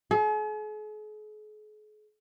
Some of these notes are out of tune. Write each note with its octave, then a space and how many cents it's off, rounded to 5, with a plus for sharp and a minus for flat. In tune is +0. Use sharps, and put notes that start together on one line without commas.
G#4 +45